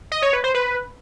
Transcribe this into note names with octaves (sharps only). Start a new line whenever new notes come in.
D#5
C#5
B4
C5
B4